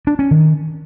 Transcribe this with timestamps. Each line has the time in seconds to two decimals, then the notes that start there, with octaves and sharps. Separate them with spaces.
0.07 D4
0.19 C#4
0.31 D#3